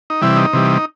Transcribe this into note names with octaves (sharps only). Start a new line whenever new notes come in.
D#4
C3 E3 G3 E4
D#4
C3 E3 G3